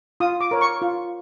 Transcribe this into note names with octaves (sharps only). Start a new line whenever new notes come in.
F4 D#6
D6
A#4 C#5
C#6
F4